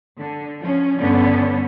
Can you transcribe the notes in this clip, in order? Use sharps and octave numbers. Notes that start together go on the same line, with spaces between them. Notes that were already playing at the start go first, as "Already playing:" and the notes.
D3
F3 C#4
G2 D3 B3 C#4